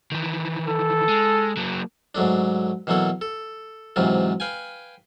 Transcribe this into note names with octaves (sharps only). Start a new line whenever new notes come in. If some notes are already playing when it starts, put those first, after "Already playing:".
D#3 E3
A4
G#3
F#3 A#3
G#2 F#3 A3 D4
B2 E3 F#3 A#3 A4
A4
G#2 C3 E3 F#3 F4
B4 F5 G5 G#5